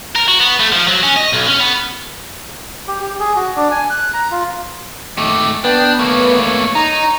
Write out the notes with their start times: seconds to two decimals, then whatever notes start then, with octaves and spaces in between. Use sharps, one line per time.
0.15 A#4
0.28 F#4
0.40 B3
0.60 A3
0.73 F3
0.88 F#3
1.03 C#4
1.16 D#5
1.33 B1
1.47 C#4
1.59 B3
2.88 G4
3.01 G4
3.19 G#4
3.36 F#4
3.56 D4
3.71 G#5
3.90 F#6
4.14 A#5
4.31 F4
5.18 D#3 A3 D6
5.64 B3 D4 G5
5.99 A3 A#3 C#5
6.75 D#4 A#5